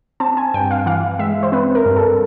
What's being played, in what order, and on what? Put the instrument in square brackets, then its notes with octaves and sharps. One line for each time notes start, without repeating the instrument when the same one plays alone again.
[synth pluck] C4 A5
G#5
G2 G5
F5
E3 F5
G#3 E5
C5
C4 B4
A#4
G2
A4